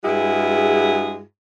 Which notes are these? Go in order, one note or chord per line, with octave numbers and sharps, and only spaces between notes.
G2 G#3 E4 F#4 G#4